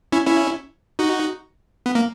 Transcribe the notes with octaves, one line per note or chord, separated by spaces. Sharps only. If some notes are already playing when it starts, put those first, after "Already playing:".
C#4 E4
C#4 E4
D#4 F#4
B3
A#3